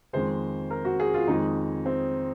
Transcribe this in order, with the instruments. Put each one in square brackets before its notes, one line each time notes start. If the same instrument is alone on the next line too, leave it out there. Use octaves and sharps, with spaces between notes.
[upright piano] F2 D#3 G#3 C5
A#4
F#4
G#4
F4
F2 D#3 G#3 D#4
C4